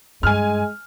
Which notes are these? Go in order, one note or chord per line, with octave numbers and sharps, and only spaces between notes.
G2 G#3 G#5 F6